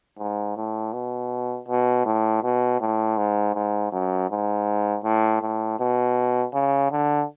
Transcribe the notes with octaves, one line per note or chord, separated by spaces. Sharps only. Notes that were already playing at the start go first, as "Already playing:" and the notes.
G#2
A2
B2
B2
A2
B2
A2
G#2
G#2
F#2
G#2
A2
A2
B2
C#3
D3